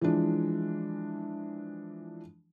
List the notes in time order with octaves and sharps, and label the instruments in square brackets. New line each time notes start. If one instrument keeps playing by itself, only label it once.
[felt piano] E3 F3 G#3 D4